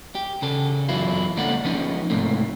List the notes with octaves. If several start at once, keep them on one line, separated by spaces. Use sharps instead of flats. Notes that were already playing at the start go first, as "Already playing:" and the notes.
G4
C#3 A4
F#2 E3 F#3 B3 E4 F4
C#2 G3 A#3 D4 A4 F#5
F3 B3 C#4 D#4
G#2 C3 A3 A#3